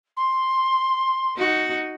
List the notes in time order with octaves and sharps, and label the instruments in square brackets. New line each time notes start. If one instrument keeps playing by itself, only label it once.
[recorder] C6
[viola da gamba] D#4 F#4